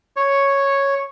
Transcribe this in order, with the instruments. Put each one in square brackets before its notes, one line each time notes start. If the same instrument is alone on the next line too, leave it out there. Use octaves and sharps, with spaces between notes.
[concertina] C#5